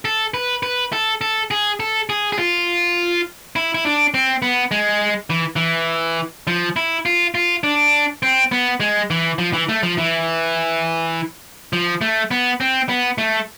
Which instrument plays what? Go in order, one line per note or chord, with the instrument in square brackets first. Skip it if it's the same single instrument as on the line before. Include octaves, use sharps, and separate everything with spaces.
[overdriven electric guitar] A4
B4
B4
A4
A4
G#4
A4
G#4
G#4
F4
E4
E4
D4
C4
B3
G#3
E3
E3
F3
E4
F4
F4
D4
C4
B3
G#3
E3
F3
E3
A3
F3
E3
F3
A3
B3
C4
B3
A3